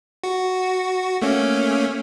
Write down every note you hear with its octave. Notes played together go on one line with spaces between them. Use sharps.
F#4
A3 A#3 C#4